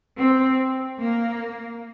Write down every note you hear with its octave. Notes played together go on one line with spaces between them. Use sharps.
C4
A#3